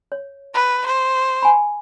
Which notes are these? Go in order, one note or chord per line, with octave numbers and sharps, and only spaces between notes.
C#5
B4
C5
G#5 B5